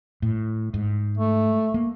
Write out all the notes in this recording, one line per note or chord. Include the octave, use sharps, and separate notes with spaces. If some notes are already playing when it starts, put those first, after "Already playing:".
A2
G#2
A3
A#3